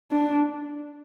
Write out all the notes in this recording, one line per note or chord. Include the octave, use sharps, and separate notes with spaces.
D4